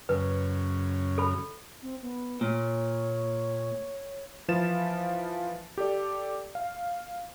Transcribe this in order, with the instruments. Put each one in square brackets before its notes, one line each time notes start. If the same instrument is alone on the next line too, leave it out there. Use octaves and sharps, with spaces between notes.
[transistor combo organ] F#2 C#3 [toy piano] B4
[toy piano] A4 B5
[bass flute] C4
B3
[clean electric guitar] A#2 [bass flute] C#5
[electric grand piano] E3 F3 B4 F5 A6 E7
G4 A4 D5
F5